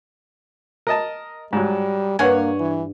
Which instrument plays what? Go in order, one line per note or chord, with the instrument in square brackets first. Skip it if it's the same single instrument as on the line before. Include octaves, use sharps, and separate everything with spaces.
[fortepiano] A#4 D#5 A5
[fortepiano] G#2 F#3 [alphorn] G3
[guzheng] G2 [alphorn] A#3 [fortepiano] C#5 F#5 G#5
[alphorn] E3